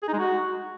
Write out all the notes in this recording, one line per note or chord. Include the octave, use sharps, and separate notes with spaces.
G#4
D#4
G#3
F#4